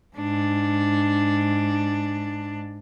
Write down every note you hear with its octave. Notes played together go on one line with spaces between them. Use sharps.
G#2 D4